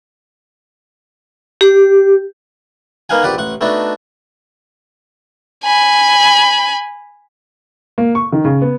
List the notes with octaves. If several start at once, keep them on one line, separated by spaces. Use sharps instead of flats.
G4
A#3 B3 D#4 F5 F#5 G#5
A#1 G4 B4 D5 F#5
A1 F#5 C#6
A3 B3 D4 D#4 F#4
G#5 B5
A#3
C#6
D#3
C#3
B3